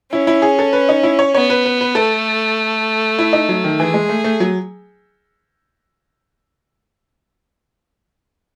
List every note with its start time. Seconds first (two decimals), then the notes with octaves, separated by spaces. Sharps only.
0.12 C#4 E4
0.27 E4
0.42 G#4
0.59 A4
0.73 B4
0.89 D#4
1.03 E4
1.19 C#5
1.34 B3 C#5
1.50 B4
1.65 B4
1.81 B4
1.95 A3 A4
3.19 E4
3.33 D#4
3.49 F#3
3.64 D#3
3.79 E3 G#4
3.94 G#3
4.09 A3
4.24 A3
4.40 F#3